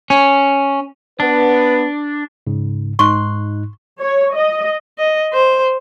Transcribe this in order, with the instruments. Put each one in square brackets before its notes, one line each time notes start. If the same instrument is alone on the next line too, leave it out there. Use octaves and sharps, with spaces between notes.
[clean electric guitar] C#4
[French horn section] B3 B4 [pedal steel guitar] D4
[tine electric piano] G#2 C#3
[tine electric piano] G#2 D#4 F#6 [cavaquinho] C6 [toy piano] C#6
[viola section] C#5
D#5
[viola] D#5
C5